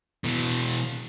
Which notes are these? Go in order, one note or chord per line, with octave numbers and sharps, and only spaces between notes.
B2 E3